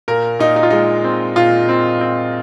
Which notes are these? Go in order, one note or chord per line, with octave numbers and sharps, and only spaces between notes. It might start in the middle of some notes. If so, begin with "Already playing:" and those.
A#2 A#4
A#2 D#4
D#4
F4
G#3 D#4
C4
A#2 F4
C4
C4